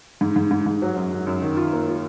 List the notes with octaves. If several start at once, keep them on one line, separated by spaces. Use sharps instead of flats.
G#2
G#2
G#2
G#2
F#3
F#2
F#2
F#2
D#3
F4
A#3
F4